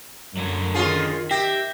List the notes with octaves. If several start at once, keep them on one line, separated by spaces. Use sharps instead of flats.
F#2 D3 F#3
D#3 C#4 F4 G#4
G4 E5 G5 A#6